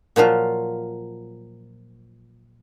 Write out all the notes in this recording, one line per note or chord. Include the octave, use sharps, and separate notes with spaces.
A#2 F3 F#3 F4